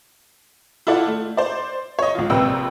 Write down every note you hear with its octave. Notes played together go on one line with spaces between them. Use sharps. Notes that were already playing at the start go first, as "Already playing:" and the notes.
E4 F4 A4 D5 F#5
A3
C5 D5
C#5 D#5
C#2 F3 F4
A#1 C3 A#3 B4 G5 E6